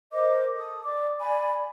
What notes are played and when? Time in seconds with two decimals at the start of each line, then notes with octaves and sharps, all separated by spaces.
0.12 A#4 C5 D#5 D6
0.54 A4 D#6
0.83 D5 D6
1.20 D5 G#5 B5